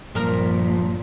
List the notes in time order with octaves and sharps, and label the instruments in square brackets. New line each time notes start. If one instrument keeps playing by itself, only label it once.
[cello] G2 A#2 [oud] F3 A#4